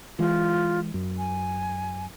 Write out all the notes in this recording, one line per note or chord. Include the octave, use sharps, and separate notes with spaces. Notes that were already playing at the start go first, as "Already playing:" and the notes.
E3 G#3 F4
F#2
G#5